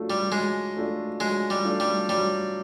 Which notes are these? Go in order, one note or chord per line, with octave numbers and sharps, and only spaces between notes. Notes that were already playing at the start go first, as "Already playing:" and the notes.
Already playing: F#3 A3 D4 F4 A4
G3
F#3 G#3
A3 D4 F4 A4
F#3 G#3
G3
A3 D4 F4 A4
G3
F#3 G3